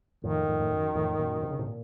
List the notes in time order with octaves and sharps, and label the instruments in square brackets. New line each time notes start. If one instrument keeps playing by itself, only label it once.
[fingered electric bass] F2 A2 [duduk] D#3
[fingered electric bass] F2 A2
A2
F#2
F2 A2
F#2 A#2
C3
C#3
A2 C3
A#2